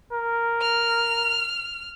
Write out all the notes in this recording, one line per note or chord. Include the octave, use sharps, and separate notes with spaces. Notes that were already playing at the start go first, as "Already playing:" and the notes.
A#4
F6